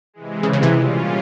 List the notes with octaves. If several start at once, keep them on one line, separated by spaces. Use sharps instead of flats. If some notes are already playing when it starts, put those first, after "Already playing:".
C3 E3 G#3
C#3
C#3
C3 E3
A#2 G3 C#4 F4